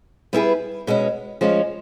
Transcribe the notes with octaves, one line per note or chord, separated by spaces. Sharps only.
G3 B3 E4 G#4 B4
B2 G#3 C#4
F3 G#3 C#4